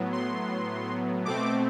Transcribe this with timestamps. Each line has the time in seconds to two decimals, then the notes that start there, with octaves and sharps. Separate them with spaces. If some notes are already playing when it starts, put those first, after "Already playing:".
Already playing: A2 F#3 B3
0.13 C6
1.25 B2 A3 C4 D6